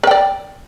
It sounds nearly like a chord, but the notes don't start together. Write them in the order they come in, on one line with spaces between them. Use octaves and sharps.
A#4 G5 D5